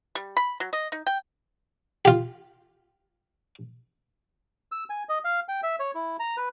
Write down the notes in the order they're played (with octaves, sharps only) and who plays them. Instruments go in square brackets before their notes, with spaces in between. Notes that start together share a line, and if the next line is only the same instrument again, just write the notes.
[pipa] G3
B5
F#3
D#5
D#4
G5
[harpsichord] F4 G4
[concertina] E6
G#5
D#5
F5
G5
E5
C#5
E4
A#5
B4